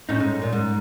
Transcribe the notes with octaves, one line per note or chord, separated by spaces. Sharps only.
A2 C#4 D#4
G#2
A#2
G#2